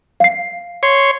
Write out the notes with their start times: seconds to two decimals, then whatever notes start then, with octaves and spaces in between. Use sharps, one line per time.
0.20 F5 C7
0.83 C#5 C6